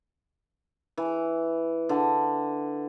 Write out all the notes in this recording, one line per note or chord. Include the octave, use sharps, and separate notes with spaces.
E3
D3